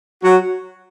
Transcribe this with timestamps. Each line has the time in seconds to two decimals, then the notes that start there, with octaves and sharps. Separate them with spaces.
0.24 F#3 F#4